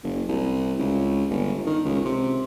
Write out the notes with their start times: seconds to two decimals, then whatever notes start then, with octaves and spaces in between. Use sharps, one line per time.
0.03 F#1
0.28 C2
0.79 C#2
1.30 G1
1.67 D#3
1.85 C#2
2.05 C3